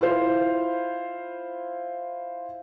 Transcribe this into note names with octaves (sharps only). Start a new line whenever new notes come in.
E4 F4 C5 F5